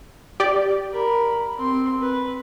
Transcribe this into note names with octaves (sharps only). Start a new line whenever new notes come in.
G4 D5
A#4 B5
C4 C6
B4